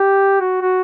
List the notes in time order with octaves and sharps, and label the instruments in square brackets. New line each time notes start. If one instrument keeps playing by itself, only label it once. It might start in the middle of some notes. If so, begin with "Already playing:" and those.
Already playing: [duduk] G4
F#4
F#4